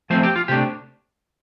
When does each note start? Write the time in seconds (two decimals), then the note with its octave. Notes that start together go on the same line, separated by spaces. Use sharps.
0.10 F3 A3 C4 C5
0.23 G4
0.36 F4
0.48 C3 A3 D4 G4